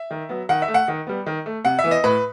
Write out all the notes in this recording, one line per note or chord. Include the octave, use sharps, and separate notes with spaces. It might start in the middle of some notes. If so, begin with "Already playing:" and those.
Already playing: E5
D#3
F#3 B3
D#3 F#5
E5
A3
F#5
D#3
G3 B3
D#3
A3
C3 F#5
E5
E3 B3
D#5
A2 B4